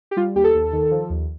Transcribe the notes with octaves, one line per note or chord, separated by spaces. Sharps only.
G4
G3 F4
D#2 G4
A4
D#2
D#3
F3
D#2